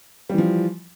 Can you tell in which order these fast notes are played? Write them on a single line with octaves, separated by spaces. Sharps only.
G3 E3 F3